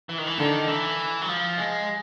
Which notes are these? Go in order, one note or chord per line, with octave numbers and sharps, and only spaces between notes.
E3
D#3
E3
D3 D#3
E3
F#3
F3
G#3